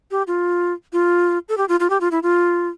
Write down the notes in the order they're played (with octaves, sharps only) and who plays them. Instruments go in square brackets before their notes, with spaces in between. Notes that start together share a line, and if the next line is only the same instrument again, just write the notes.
[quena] G4
F4
F4
A4
G4
F4
F4
G4
F4
E4
F4